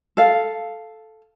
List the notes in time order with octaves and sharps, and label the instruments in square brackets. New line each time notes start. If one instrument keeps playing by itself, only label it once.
[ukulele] A4 F5